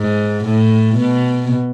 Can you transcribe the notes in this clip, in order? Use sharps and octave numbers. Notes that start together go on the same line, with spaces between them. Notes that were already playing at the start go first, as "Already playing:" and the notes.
Already playing: G#2
A2
B2